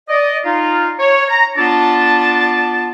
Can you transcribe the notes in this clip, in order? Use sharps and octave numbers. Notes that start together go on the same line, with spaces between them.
D5 D#5
D#4 F4
C#5
A#5
B3 D4 F4 D5 A5